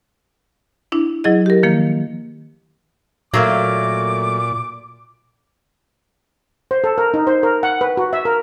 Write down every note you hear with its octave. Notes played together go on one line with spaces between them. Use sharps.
D4 E4
F#3 E4 G#4 D#5
G4 A#4
D#3 F3 A#3
A#2 F#3 A3 A#3 D6
C5
A4
A#4
D#4
C5
A#4
F#5
B4
F#4
E5
A#4